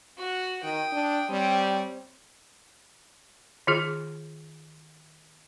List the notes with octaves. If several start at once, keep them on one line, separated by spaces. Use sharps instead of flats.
F#4
D#3 G5 D#6
D4
G3 C4 C#5
D#3 F4 G#4